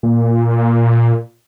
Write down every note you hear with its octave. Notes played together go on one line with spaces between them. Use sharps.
A#2